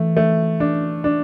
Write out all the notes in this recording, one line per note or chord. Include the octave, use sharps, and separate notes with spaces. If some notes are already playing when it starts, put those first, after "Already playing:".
Already playing: E3 A3
A3
D4
D4